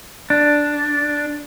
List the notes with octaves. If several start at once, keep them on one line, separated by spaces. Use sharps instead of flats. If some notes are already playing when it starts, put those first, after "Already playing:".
D4